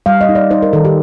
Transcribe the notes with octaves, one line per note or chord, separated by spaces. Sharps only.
G3 F5
D#5
D#4
D5
D#4 C5
A#4
D#3 A4
G4